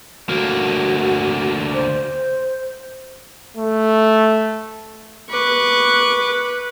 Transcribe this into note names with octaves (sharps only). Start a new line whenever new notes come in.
D2 A#3 F#4
C5
A3
B4 C#6 D6